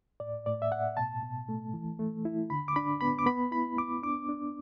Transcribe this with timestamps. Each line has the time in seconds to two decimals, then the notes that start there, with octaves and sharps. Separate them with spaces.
0.20 A2 D5
0.46 A2 D5
0.62 E5
0.71 A2 F#5
0.97 B2 A5
1.23 B2
1.49 A3
1.74 E3
1.99 A3
2.25 E4
2.50 D3 B5
2.68 D6
2.76 D4 B5
3.01 B3 B5
3.19 D6
3.26 B3 B5
3.52 E4 B5
3.77 B3 D6
4.03 D4 D6
4.29 D4